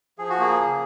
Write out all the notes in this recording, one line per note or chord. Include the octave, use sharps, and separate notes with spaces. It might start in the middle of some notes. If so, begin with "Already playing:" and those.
F3 G#4
F#4
A#3 G#4
C#3